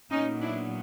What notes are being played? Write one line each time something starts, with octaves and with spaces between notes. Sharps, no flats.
A#2 F#3 B3 C#4 D#4
D4 E4